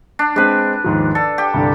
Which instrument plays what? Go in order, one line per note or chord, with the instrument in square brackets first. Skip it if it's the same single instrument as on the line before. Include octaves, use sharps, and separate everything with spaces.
[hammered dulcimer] D4
[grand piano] G#3 C4 [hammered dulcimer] D4 B4
[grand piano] D#2 G#2 F3
[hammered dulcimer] A4 [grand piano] D5
[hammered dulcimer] G4
[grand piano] C2 G2 D3